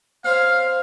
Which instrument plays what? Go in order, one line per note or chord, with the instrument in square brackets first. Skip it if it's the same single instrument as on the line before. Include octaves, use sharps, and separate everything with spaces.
[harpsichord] C4 C5 C#5 [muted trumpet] F5